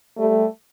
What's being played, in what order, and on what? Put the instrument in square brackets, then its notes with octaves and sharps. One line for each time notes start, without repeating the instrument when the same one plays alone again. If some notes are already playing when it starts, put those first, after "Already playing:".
[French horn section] G3 A3